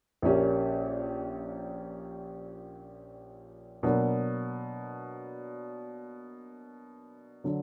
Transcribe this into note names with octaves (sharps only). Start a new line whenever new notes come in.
A#1 A#2 A#3 C#4 G4
B2 F#3 A#3 D4
D3 F#3